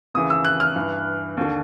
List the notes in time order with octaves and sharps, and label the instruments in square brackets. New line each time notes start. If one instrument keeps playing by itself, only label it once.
[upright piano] D#2 C#3 E3 D#6
E6
F#6
F6
G2 E3
D#2 D3